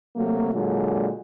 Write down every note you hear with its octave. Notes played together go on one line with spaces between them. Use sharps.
C3 F#3 A3 A#3
A#2 D3 F#3 G#3